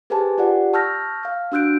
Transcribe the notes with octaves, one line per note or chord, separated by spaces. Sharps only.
G4 G#4 B4 C5 G#5 A5
F4 G4 D5 F#5
A5 C#6 E6 F6 G6 A#6
F5 F6
D4 F#4 E6 F#6 G6 D7